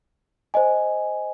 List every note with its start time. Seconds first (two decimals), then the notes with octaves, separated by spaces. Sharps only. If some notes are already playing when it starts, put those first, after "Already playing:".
0.54 C5 D#5 G#5